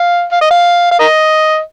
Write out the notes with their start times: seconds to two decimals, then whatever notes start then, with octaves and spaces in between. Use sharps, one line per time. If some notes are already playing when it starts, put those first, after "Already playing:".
Already playing: F5
0.32 F5
0.41 D#5
0.51 F5
0.91 F5
0.99 A#4 D#5